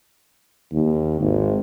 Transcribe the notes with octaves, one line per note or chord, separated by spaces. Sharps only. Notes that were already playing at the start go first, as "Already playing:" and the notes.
D#2
G#1